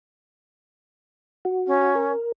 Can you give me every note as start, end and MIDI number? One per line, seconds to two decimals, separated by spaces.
1.45 1.95 66
1.67 2.12 61
1.95 2.32 70